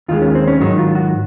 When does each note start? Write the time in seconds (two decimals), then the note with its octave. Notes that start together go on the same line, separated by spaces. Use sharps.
0.08 D#2 D#3 G#3 F4
0.22 C#4
0.35 C4
0.48 C#4
0.60 G#2 D#3 F#3 D#4
0.78 F4
0.95 F#4